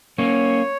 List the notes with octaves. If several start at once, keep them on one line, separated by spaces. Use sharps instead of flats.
A#3 C#4 C#5